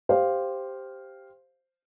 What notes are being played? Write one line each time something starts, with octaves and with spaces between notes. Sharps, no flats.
G4 C5 F5